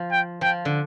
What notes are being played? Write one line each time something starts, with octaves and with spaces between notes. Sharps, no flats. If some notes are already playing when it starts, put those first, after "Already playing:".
Already playing: F3
G5
F3 G5
D3